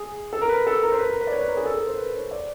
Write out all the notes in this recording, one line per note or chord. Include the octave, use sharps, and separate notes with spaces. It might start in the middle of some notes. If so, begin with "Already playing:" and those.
Already playing: G#4
A4
A#4
B4
A4
A#4
C5
B4
A#4
B4
D5
C#5
B4
A#4
G#4
A4
A#4
C5
B4
C#5
D5